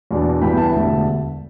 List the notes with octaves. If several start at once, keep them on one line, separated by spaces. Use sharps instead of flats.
E2 B2 B3 D4
G1 G2 E3 G3 B3 G5 B5
E5 A5
E1 D2 D3